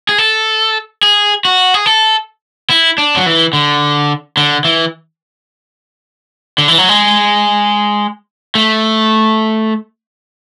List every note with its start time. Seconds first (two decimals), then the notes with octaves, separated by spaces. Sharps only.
0.09 G#4
0.18 A4
1.03 G#4
1.45 F#4
1.74 G#4
1.86 A4
2.70 E4
2.98 D4
3.16 F#3
3.26 E3
3.53 D3
4.37 D3
4.65 E3
6.58 D3
6.68 E3
6.78 F#3
6.89 G#3
8.55 A3